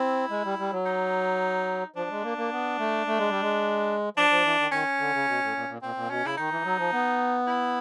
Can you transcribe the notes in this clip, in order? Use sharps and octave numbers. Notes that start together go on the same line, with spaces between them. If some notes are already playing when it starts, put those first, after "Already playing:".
Already playing: C4 E4
G#3
G3
G3
F#3
D#4
F3 D4
G#3
A#3
A#3
B3
A3
A3
G#3
G3
G#3
F3 D4
F3
E3
D#3
D#3 C#4
D3
C#3
B2
A2
A#2
A#2
A#2 C4
A#2
B2 C#4
C#3 E4
D#3 D#4
E3
F#3
F3
B3
E4